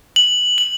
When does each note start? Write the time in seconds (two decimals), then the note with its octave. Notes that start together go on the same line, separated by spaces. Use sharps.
0.16 F#7
0.58 F#7